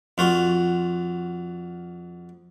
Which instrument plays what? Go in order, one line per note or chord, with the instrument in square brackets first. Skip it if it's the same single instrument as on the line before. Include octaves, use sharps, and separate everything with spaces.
[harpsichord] F2 F4 F#4